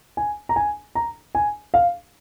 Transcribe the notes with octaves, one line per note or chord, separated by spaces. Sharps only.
G#5
A#5
G#5
A#5
G#5
F5